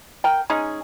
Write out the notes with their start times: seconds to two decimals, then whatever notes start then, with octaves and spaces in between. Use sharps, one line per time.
0.24 A#4 G5
0.50 G#3 C#4 D#4 G#4